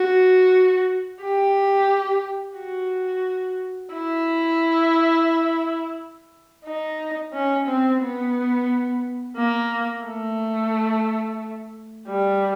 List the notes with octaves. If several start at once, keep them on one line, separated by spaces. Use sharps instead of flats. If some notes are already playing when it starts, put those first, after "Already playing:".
Already playing: F#4
G4
F#4
E4
D#4
C#4
C4
B3
A#3
A3
G3